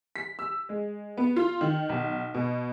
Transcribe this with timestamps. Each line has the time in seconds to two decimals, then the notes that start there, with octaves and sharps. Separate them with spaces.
0.16 B6
0.39 E6
0.69 G#3
1.17 B3
1.36 F4
1.61 D#3
1.89 B1
2.34 B2